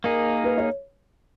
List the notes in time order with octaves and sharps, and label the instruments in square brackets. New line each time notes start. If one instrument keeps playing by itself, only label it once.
[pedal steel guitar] A#3 D#4 G#4 [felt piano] A#4
[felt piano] B4
C#5